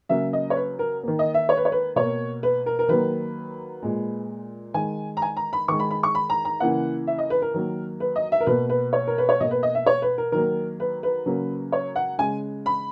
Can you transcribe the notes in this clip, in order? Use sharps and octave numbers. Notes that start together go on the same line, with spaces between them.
C#3 F#3 A#3 E5
D#5
C#5
B4
A#4
D#3 A#3
D#5
E5
C#5
B4
C#5
B4
B2 A#3 C#5
B4
A#4
A#4
D#3 F#3 A#3 B4
A#2 G#3
D#3 G#3 G#5
A#5
G#5
A#5
B5
D#3 G#3 C#6
B5
B5
C#6
B5
A#5
A#5
C#3 E3 A#3 F#5
E5
D#5
B4
A#4
D#3 F#3 A#3
B4
D#5
E5
A#4
B2 A#3 B4
B4
C#5
A#4
B4
C#5
B2 A#3 D#5
B4
D#5
E5
C#5
B4
A#4
D#3 F#3 A#3 A#4
B4
B4
C#3 F#3 A#3
C#5
F#5
C#3 G#3 G#5
B5